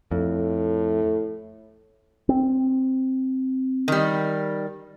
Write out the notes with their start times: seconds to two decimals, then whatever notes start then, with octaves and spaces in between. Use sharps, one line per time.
0.11 F2 A2
2.29 C4
3.88 D#3 G3